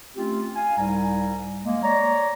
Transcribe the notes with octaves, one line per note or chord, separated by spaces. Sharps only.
A3 C4 C#4 F4 G4
F5 G#5
C2 G#2 G3 G#5 A#5
G#3 A#3
C#5 D5 A#5